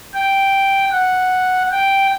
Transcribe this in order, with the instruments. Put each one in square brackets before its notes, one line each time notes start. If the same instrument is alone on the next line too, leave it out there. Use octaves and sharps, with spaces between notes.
[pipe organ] G5
F#5
G5